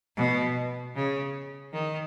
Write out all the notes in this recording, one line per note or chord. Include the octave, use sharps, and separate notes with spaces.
B2
C#3
D#3